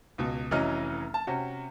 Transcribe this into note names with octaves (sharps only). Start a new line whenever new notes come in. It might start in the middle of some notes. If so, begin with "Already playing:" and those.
C#2 B2
F1 E3 F#3 C#4 D#5 F6
A5
C3 C#4 F#4